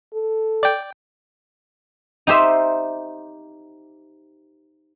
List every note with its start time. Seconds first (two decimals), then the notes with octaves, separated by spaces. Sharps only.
0.14 A4
0.63 D5 G5
2.27 D#4 G4 C5 E5